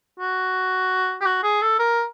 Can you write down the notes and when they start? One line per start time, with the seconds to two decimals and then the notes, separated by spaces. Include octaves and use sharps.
0.20 F#4
1.21 G4
1.26 F#4
1.43 G#4
1.62 A4
1.79 A#4